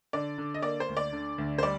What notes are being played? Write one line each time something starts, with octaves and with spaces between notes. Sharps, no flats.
D3 D5
D3
D#5
A#3 D5
C5
D2
D5
D3
D2
C5
G3 D5